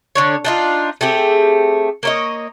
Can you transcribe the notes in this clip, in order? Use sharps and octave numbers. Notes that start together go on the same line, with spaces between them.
D3 D4 C#5
D4 D#4 F4
A3 C4 G4 G#4
A#3 C#5 D#5